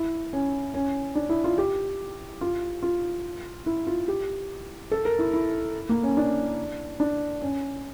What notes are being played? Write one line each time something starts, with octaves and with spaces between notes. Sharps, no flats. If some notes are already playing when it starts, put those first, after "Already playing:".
Already playing: E4
C#4
C#4
D4
E4
F4
G4
F4
F4
E4
F4
G4
A4
A#4
E4
E4
A#3
C#4
D4
D4
C#4